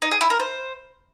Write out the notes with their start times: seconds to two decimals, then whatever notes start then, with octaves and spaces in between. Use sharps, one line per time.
0.02 D#4
0.11 G#4
0.21 E4
0.30 A#4
0.40 C5